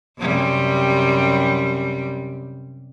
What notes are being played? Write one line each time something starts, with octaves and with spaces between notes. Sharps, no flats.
F#2 C3 G3